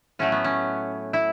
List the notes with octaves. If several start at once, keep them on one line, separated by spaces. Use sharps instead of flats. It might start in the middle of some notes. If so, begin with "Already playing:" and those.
A2 F#3 A3 C#4
B3
C#4
E4